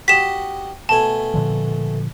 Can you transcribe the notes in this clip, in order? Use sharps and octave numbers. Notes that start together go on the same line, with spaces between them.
F#4 G4 D#5 B6 E7
B2 A3 G#5 A5
A#2 D3 F3